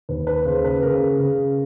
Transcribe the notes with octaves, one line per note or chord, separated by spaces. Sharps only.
D#2 B4
B4
C#3 C5
B4
C#3 A#4
C#3